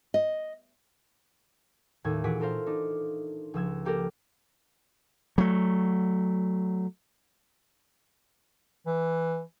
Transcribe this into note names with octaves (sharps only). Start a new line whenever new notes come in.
D#5
D#2 A2 E6 G#6
A#2 E3 F#4 G#4 B6 D7
F4 A4 A#4 C5 F5
D4 D#4
C#2 F3 E6 G#6
A#3 G4 A4 A#4
F#3 A3
E3